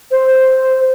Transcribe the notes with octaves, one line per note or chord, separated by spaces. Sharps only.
C5